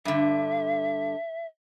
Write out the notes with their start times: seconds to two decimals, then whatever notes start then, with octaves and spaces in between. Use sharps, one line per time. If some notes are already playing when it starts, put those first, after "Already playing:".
0.05 G2 D3 E5